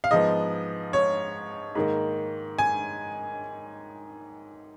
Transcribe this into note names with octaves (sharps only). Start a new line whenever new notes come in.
F5
G#2 F3 B3 D#5
C#5
G#2 D#3 A#3
G#5